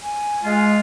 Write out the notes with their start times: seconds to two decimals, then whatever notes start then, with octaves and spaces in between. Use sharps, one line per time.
0.02 G#5
0.44 G#3 F4